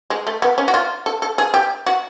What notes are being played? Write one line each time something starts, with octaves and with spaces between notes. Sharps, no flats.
G#3
A3
B3
C#4
F#4
F4
A4
A4
G#4
G4
F#4